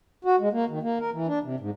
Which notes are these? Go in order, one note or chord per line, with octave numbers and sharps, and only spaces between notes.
F#4
G#3
A#3
D#3
A#3
A#4
E3
D4
C3
G#2